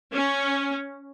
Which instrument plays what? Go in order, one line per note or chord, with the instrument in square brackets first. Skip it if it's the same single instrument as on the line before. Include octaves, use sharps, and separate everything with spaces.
[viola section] C#4